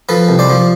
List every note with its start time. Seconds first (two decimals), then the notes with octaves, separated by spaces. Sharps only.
0.09 F3 A4 B4
0.29 C2
0.39 C5 D5
0.50 F3